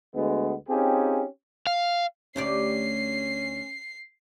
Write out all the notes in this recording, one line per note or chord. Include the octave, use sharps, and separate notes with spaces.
D2 G#3 B3
C4 C#4 D#4 F4 G4 G#4
F5
D2 C#4 G4 D5 C7